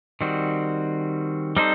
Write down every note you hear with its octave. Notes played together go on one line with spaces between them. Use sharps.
D#3 G3 C4 F#4
G3 C4 D#4 A4 C5